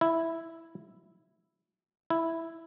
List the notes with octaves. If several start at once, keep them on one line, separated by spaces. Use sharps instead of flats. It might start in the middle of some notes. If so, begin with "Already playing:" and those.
E4
E4